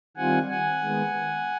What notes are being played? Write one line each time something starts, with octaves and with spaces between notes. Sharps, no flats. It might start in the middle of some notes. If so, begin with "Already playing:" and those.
D#3 G3 C4 F4 F#5 G#5
F#5 G#5
D#3 G#3 B3